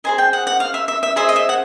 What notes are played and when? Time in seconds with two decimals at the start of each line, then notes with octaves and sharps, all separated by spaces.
0.04 G#4 C5 D#5 G#5
0.18 G5
0.33 F#5
0.47 F#5
0.60 F5
0.74 E5
0.88 E5
1.03 E5
1.16 G#4 C5 D#5 E5
1.29 D#5
1.36 E5
1.49 F#5